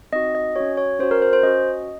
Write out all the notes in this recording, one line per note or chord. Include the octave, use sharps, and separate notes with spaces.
C4 D#4 F#4 D#5
D#5
C#4 F#4 C#5
C#5
C#4 F#4 C5
A#4
C5
C5
C#4 F#4 D#5